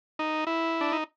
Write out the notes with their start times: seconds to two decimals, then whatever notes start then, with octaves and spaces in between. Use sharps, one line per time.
0.19 D#4
0.47 E4
0.81 D4
0.92 D#4